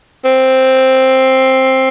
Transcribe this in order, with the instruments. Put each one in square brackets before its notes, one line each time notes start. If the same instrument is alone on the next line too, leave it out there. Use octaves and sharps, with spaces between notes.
[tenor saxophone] C4